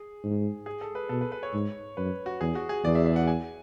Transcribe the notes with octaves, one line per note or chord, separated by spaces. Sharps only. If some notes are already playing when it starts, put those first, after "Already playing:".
Already playing: G#4
G#2
G#4
A4
B4
B2 A4
B4
B4
C#5
G#2
F#2 B4
F#4
E2 G#4
F#4
G#4
E2 D5
E5
E5
F#5
G#5